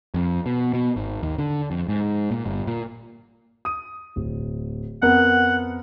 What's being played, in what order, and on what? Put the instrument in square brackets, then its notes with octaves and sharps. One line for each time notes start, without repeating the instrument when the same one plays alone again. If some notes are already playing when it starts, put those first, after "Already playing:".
[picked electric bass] F2
B2
B2
G#1
D#2
D3
F2
G#2
A#2
G1
A#2
[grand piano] D#6 D#7
D1
[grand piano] F2 B3 A#4 [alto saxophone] F#5